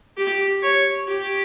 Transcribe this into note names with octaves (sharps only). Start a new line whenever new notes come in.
G4
C#5
G4